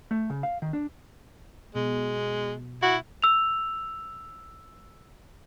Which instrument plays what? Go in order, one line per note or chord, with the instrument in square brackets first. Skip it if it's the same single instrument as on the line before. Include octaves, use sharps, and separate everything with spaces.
[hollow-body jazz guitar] A3
C#3
F5
D#3
D4
[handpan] B2 [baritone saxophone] G#3
[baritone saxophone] E4 [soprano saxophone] F#4
[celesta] E6 F7